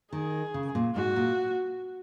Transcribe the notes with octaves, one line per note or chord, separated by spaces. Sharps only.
D#3 G#4
C#3
A#2
G#2 F#4
A#2